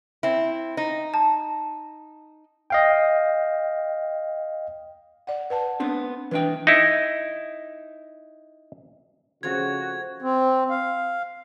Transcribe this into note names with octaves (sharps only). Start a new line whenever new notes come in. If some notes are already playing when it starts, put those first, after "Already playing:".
C4 E4
D#4
A5
D#5 F5 G5
D5 F#5
B4 F#5 A5
B3 C4 D4
E3 D4 B4 G5
D#4 E4
C#3 F3 A3 C4 F#4 G#6
C4
F5